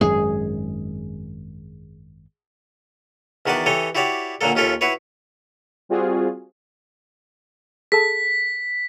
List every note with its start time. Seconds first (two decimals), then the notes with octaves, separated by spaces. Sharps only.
0.01 G#1 F#2 G#3 G#4
3.46 E2 D#3 F#4 B4 D5 A5
3.66 E3 G4 A4 C#5 D#5
3.95 E4 F#4 G4 C#5 D5
4.41 A#2 D3 F#3 A#3 A4
4.55 D#2 C#4 F4 A4 E5
4.81 E4 F#4 B4 C#5
5.89 G3 C4 F4 F#4 G#4
7.92 G#4 A4 A5 B6